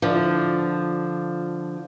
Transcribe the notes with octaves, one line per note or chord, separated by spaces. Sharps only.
D3 F3